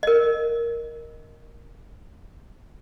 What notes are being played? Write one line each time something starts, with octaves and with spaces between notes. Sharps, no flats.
A#4 D#5